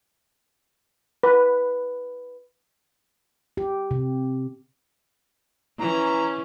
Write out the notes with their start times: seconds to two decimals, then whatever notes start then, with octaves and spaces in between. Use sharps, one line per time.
1.23 B4
3.57 G4
3.91 C3
5.79 E3 C#4 A#5